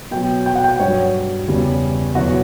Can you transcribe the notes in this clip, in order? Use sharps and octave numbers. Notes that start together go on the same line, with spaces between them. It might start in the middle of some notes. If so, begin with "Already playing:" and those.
B2 F#3 G5
G5
F#5
G5
G2 F#3 C#5
E2 C#3 G3
E2 B2 F#3 F#4